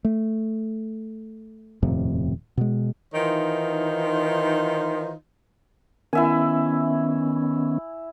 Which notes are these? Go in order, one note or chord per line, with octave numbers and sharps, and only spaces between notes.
A3
D#1 F2 A2 C3
B2 G#3
D#3 E3 D#4 F4 C5
D#3 B3 C#4 E4 E5 G#5